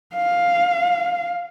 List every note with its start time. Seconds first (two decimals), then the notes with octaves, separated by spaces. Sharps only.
0.15 F5